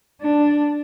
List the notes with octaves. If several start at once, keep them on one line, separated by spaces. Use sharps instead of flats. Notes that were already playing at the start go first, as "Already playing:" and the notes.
D4